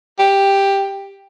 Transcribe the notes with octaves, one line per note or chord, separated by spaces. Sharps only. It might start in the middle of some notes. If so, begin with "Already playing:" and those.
G4